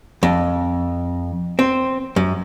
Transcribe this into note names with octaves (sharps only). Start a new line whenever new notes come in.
F2
C4
F#2